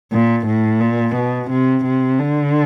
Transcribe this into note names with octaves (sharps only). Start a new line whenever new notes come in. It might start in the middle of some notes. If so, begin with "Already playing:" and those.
A#2
A2
A#2
B2
C3
C3
D3